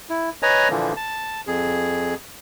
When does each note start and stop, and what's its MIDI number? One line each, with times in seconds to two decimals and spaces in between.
0.10 0.30 64
0.43 0.68 71
0.43 0.68 73
0.43 0.68 75
0.43 0.68 80
0.43 0.68 82
0.70 0.93 46
0.70 0.93 50
0.70 0.93 52
0.70 0.93 53
0.70 0.93 58
0.97 1.41 81
1.47 2.15 41
1.47 2.15 68